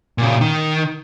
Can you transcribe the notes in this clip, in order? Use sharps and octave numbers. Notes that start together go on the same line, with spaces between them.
A#2 C#3
D#3